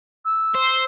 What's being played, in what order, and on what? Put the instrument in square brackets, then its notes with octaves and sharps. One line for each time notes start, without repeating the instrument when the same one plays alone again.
[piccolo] E6
[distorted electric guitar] C5